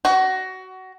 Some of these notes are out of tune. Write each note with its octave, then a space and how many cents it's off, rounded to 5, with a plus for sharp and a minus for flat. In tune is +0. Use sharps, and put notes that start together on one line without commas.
F#4 +20